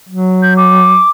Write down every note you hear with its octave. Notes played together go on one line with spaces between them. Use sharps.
F#3
G6
D6